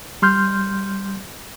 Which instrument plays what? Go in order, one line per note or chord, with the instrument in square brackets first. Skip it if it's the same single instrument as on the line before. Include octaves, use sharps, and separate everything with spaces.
[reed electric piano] G3 C6 F6 G6